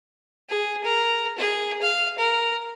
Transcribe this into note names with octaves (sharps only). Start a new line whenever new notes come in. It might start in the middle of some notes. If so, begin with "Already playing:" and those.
G#4
A#4
G#4
F5
A#4